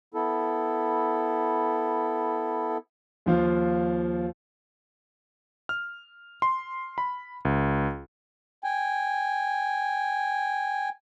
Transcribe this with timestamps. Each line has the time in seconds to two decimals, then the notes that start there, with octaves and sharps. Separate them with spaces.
0.14 B3 E4 A4
3.26 D#2 F3 F4
5.69 F6
6.42 C6
6.98 B5
7.45 C#2
8.64 G5 G#5